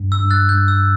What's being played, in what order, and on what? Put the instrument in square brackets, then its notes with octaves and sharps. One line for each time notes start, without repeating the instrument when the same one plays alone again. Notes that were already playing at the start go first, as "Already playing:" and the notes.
Already playing: [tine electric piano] G2
[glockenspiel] E6
[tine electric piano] G2
[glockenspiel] F#6 A6
[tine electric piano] G2 [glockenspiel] G6
[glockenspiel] E6